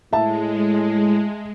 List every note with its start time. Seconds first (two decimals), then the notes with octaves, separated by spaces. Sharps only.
0.13 A2 G#3 E5 A5